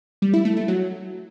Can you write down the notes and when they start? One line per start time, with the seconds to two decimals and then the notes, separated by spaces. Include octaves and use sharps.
0.22 G3
0.34 E4
0.45 A3
0.57 A3
0.68 F#3